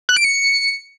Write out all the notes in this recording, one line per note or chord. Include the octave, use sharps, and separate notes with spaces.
F#6
D7
C#7